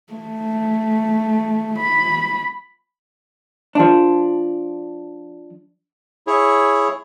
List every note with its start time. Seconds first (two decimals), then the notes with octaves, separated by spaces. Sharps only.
0.13 A3
1.79 B5
3.75 F3 D4
6.27 E4 G#4 C#5